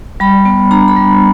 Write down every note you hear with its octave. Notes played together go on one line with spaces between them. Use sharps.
G3 B5
B3
D4 A#5
B5
G3